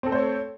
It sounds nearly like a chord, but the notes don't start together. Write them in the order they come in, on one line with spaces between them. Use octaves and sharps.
C4 A4 A3 C5 C#5